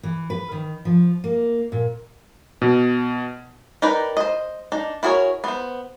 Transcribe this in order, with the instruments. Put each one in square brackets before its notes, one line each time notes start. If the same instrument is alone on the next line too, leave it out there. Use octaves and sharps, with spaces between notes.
[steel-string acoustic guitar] E3
B4
D#3
F3
A#3
A#2
[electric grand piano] B2
[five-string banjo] D#4 G4 A#4 B4 D5
C5 D#5
D4 D#4
E4 F#4 G#4 A#4 C#5
B3 C5